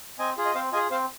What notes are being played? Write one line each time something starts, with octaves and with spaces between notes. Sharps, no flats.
C4 D#5 G#5
F4 G#4
D#5
C4 C5 F5
F4 G#4 D#5 G#5
C4 C5 F5